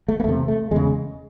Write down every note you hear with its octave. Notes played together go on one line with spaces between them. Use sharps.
A3
A#3
E2 C3 A3
A3
E2 C#3 G#3